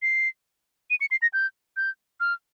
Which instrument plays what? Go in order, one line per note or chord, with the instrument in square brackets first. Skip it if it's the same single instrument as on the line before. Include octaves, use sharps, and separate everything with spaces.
[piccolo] C7
D#7
C#7
C7
A#6
G6
G6
F6